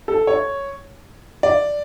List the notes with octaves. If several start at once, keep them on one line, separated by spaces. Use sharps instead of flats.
A4
C#5
D5